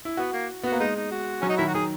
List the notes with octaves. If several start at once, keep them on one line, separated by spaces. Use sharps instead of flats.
E4
B3 F#4
A#3
B3 F#4
A#3
G#3 D#4
D#4
F#4
F#3 C#4
D#4
D#3 E4
F#4
D#3 G#4